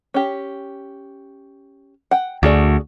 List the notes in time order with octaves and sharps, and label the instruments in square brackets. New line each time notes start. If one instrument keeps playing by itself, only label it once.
[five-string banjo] C#4 G4
F#5 G5
[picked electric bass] D2 [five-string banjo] F#4 G#4 D5